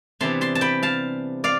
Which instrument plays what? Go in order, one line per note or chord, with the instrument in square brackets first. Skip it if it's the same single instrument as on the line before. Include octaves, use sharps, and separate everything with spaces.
[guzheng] C3 E3 G3 B3 D4 A5 C6
A5 C6
A5
G5 B5
F5 A5
D5 F5